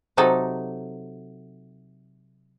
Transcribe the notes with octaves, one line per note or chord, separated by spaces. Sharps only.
C3 F#3 D#4 A4